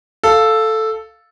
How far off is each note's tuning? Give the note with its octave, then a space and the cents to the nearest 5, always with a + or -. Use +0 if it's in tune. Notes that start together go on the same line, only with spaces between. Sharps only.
A4 +0 F5 +0